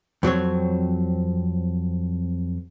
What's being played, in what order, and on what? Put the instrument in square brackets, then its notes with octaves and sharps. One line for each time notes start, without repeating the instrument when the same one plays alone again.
[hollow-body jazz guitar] F2 F#3 C4 C#5